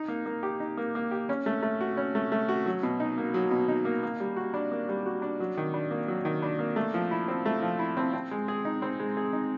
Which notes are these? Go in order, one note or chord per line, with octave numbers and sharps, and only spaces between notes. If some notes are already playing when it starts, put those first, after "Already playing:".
Already playing: D#4
A#3
A#3
G4
D#4
A#3
A#3
G4
C#4
A3
A3
F#4
C#4
A3
A3
F#4
F#3
B2
D#4
A#3
F#3
B2
D#4
A#3
A#3
G3
F#4
D4
A#3
G3
F#4
D4
F#3
D#3
D4
A#3
F#3
D#3
D4
A#3
A3
F3
E4
C4
A3
F3
E4
C4
C4
G#3
G#4
D#4
C4
G#3
G#4
D#4